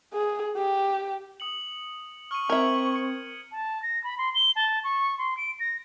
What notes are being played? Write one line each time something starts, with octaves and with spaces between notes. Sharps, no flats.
G#4
G4
D#6 C#7 F#7
C#6 F6 D#7
C4 A#4 E5 G#6 F#7
C#7
A5
A#6
B5
C6
G7
A5
C#6
C6
D7
A#6